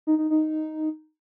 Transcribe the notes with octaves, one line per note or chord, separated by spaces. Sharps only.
D#4
D#4
D#4